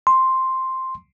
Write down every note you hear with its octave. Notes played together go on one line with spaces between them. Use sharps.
C6